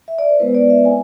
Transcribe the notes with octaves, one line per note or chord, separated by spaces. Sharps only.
E5
D5
C5
G#3 B3 E4 B4
D5
E5
G#3 C4 E4 G#5